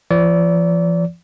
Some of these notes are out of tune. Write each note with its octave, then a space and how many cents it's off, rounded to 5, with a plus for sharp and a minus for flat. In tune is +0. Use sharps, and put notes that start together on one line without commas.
F3 -40 D5 -30